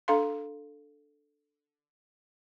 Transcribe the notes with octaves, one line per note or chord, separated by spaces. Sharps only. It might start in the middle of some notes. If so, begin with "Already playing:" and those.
D4 A4 F5 C6